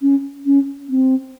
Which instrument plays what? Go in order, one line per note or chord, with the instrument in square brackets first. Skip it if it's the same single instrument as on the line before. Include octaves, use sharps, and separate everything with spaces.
[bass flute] C#4
C#4
C4